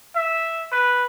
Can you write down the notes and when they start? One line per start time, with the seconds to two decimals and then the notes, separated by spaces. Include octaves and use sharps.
0.16 E5
0.72 B4